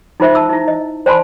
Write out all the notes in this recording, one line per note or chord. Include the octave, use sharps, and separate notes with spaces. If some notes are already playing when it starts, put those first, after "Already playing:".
D#4 F4 C5 E5
A5 E6
D#4 E4
D#5
C5 D5 G#5 A5 B5 C6